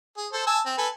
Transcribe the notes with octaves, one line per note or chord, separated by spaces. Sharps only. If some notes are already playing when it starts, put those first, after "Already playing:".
G#4
A4 C5
G#5 A5 E6
C4
A4 B4 G#5